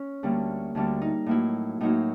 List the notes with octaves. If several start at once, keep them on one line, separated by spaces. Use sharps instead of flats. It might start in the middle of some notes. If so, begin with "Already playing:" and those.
Already playing: C#4
D2 D3 G3 A#3
D2 D3 G3 A#3 D4
D#4
A2 F#3 A#3 E4
A2 F#3 A#3 D#4